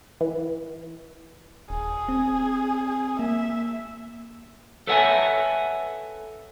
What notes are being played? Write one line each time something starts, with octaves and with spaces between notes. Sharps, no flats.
E3
D#1 G#4
C4
G#4
A#3 E5
A4 B4 C#5 E5 F#5 G#5